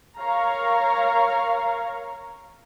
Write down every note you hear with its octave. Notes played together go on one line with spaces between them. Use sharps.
A#4 C#5 F5 A#5